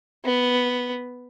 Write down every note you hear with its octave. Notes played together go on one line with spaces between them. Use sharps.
B3